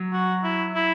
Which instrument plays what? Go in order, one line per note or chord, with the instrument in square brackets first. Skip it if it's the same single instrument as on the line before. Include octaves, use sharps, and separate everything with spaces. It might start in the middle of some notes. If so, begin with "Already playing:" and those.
Already playing: [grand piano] F#3
[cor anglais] F#4
E4
E4